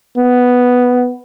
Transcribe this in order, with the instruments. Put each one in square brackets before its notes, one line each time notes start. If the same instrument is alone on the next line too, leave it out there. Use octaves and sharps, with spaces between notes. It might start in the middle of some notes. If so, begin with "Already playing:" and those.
[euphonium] B3